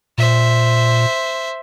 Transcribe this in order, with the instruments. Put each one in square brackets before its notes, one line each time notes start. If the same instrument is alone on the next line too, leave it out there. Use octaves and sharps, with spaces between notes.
[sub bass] A#2 [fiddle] C5 E5